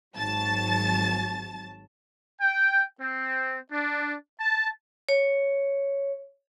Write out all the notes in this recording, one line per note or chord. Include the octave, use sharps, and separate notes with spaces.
G#1 F#3 A5 A6
G5
C4
D4
A5
C#5